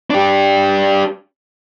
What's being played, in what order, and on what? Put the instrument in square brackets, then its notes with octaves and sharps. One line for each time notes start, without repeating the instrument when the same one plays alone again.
[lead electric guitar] D4 G4